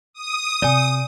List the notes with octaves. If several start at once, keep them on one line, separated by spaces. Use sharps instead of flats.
D#6
C3 D5 G#5